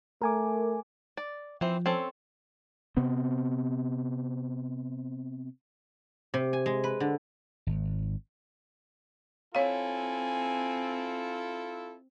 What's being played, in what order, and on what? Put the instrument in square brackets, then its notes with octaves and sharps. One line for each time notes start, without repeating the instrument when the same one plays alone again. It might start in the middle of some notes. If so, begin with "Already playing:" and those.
[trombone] A3 [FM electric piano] A#4 G#5 D6
[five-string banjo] D5
[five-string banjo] E3 C4 [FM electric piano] F3
[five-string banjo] C4 C#4 A4
[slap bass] C3 B3 C4
[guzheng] C3
G#5
G#3
B4
D3
[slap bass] G#1
[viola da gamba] C4 [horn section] E4 F4 A4 [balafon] C#5 F5 [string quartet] G#5